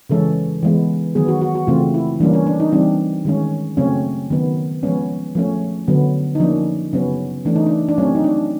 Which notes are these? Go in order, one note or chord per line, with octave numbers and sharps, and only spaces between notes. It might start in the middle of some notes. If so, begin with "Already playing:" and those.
C#3 E3 G#3 C#4 A4
E3 G#3 B3
D#3 F#3 B3 G#4
F#4
F#4
F#4
C#3 E3 A3 C4 F4
E4
E3 G3 A#3 C#4 D4
C#4
D4
D#4
E3 G3 C4 D4
D#3 G#3 C#4
C#3 F#3 A3 C4 C#4
D#3 F#3 B3
F3 G#3 B3 C#4
F3 A3 C#4
D3 F#3 B3
D#4
F3 A#3 C#4 D4
C#3 F#3 B3 C#4
E3 A3 C#4 D4
D#4
D4
D4
F#3 A3 C4 C#4
D#4
D4